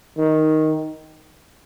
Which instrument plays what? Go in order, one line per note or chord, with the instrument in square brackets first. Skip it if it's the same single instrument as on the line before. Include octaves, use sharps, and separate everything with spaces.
[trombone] D#3